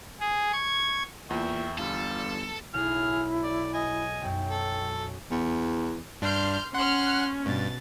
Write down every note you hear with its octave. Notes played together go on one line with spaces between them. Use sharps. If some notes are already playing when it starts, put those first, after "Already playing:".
G#4
C#6 G#6
E2 A#2 E5 G5 C#6
G1 G3 F4 A4
B1 E4 G#4 F6
D5
D#5 G#5
B1 F#2 G5
A4
E2
G2 D4 C6 F6 G6
C#4 F#5 C6 F6 F#6
G2 B2 A6